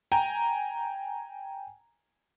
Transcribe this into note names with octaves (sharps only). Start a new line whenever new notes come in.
G5 G#5 A#5